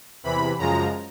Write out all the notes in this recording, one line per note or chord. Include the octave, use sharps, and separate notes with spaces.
E2 C3 E3 B5
F#2 C#3 F3 G#3 A#5